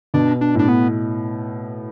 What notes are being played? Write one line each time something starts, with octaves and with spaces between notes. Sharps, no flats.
B2 D4
D4
A2 D4
B3